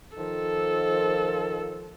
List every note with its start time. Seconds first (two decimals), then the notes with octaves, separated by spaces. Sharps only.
0.17 D#3 F3 A4